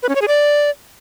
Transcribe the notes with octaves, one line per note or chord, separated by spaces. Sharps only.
B4
C#4
C#5
G#4
D5